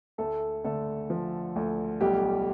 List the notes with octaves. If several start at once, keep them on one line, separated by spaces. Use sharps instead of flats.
D2 A3 A4
D3 A3 A4
F3
D2
B1 G3 G4